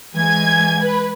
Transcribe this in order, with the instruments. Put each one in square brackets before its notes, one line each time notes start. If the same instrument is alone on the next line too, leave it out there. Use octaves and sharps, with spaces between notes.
[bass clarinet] E3 [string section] G#3 G#5 G#6
[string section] B4